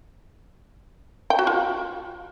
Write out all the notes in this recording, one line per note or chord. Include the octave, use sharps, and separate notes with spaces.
G5
F#4
F4